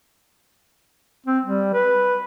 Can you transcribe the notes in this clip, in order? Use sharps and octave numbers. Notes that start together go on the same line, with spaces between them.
C4
G3
B4